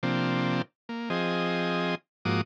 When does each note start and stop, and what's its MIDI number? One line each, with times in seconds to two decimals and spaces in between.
0.03 0.62 48
0.03 0.62 53
0.03 0.62 58
0.03 0.62 60
0.03 0.62 62
0.89 1.09 58
1.10 1.95 53
1.10 1.95 60
1.10 1.95 68
1.10 1.95 75
2.25 2.41 44
2.25 2.41 53
2.25 2.41 58
2.25 2.41 66
2.25 2.41 86
2.25 2.41 87